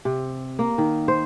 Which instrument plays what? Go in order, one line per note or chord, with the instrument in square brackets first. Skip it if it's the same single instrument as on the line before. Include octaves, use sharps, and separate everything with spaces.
[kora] C3
A#3
D#3
C5